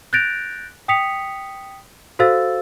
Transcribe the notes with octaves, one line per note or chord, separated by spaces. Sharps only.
F#6 G6 A6 A#6 D7 F7
G5 D#6 B6 C#7 F7
F#4 A4 C5 F5 E6 A6